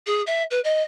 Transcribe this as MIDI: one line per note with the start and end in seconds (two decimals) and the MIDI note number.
0.07 0.21 68
0.27 0.43 76
0.51 0.60 71
0.64 0.82 75